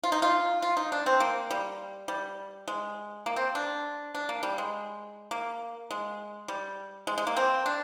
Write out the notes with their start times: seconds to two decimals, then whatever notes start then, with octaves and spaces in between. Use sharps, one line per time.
0.03 F4
0.12 D#4
0.22 F4
0.62 F4
0.77 D#4
0.92 D4
1.06 C4
1.20 A#3
1.51 G3
2.08 G3
2.68 G#3
3.26 A#3
3.36 C4
3.55 D4
4.15 D4
4.29 A#3
4.43 G3
4.58 G#3
5.31 A#3
5.91 G#3
6.48 G3
7.07 G#3
7.18 G#3
7.27 A#3
7.36 C4
7.66 D4